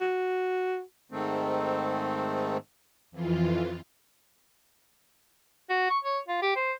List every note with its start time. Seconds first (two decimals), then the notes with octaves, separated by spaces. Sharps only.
0.01 F#4
1.12 G#2 D#3 A3 C4
3.11 F2 E3 F4
5.69 F#4
5.89 C#6
6.04 C#5
6.28 F4
6.42 G4
6.56 C5